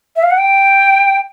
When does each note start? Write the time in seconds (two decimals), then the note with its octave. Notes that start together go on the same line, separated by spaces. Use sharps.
0.16 E5
0.23 F5
0.31 F#5
0.38 G5